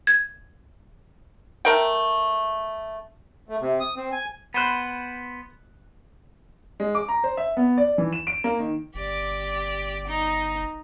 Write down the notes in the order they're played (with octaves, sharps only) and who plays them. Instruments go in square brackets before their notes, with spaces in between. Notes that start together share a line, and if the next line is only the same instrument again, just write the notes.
[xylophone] G#6
[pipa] A3 A#4 G5
[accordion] A3
C3
D#6
C4
G#5
[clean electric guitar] B3 C5 [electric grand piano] B5 F#6
[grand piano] G#3
D6
A#5
C5
E5
B3
D5
E3
E7
D7
A#3
D#3
[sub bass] G1 [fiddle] G4 D5
[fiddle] D#4